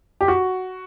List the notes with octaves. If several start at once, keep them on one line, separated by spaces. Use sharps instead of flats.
G4
F#4